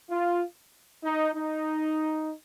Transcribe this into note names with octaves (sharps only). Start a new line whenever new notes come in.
F4
D#4
D#4